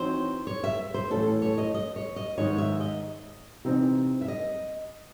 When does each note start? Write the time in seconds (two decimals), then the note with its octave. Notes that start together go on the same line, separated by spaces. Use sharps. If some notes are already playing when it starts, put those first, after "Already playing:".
Already playing: E3 C4 D#4 F#4 C5 C#5
0.47 C#5
0.64 E5
0.94 C5
1.10 A2 E3 A3 C#4 A4
1.42 C#5
1.58 D#5
1.74 D#5
1.96 C#5
2.16 D#5
2.38 G#2 D#3 G#3 C#5
2.58 E5
2.80 D#5
3.65 C3 E3 C4 D#4
4.21 E5
4.28 D#5